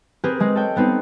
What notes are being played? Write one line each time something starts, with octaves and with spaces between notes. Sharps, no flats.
C4 G4 G#4 A#4 B4
G#3 C4
A4 C#5 G5
G3 B3 C4 D#4